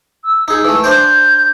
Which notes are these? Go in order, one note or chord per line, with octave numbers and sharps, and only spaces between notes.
E6
D#4 G#4 E6
E3 A3
D4 C5 G5 G6